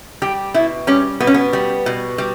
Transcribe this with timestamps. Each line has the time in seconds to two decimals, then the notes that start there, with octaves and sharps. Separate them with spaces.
0.22 G3 G4
0.54 B2 E4
0.87 G3 C#4
1.20 B2 B3
1.27 C#4
1.34 B3
1.53 G3
1.86 B2
2.18 G3